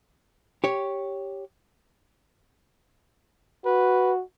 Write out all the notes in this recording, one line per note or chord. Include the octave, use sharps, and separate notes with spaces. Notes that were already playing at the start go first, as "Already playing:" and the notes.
G4 C#5
F#4 B4